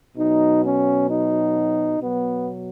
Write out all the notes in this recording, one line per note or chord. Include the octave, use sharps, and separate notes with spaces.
B2 F#3 D#4
C#4
D#4
B2 F#3 B3